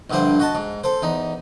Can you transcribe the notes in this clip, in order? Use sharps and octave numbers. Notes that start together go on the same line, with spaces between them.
A#1 G2 D3 E4 C5
F#4 D#5 A5
G#2
A4 C5
E2 D#4